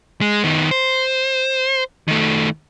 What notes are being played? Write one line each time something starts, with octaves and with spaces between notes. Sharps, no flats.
G#3
D#3 B3
C5
D#3 A3